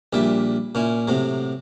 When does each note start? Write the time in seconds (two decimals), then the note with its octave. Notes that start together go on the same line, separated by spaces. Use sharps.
0.13 A#1 A#2 G3 E5
0.75 A#2 C#4 E4
1.08 A2 C3 F#3